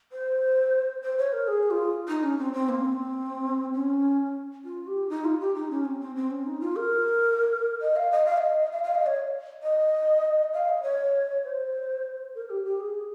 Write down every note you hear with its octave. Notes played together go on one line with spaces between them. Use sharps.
C5
C5
C#5
A#4
G#4
F4
D#4
C#4
C4
C4
A#3
C#4
C4
C#4
F4
G4
D#4
F4
G4
D#4
C#4
C4
C4
C4
C#4
D#4
F4
A#4
D#5
F5
D#5
F5
D#5
F5
F5
D#5
C#5
D#5
F5
D#5
C#5
C5
A#4
G4
G4
G#4